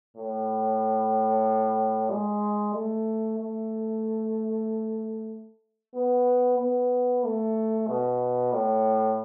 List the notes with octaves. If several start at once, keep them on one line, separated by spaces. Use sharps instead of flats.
A2
G#3
A3
A3
B3
B3
A3
B2
A2